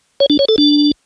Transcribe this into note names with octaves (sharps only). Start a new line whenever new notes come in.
C#5
D4
C#5
A4
D4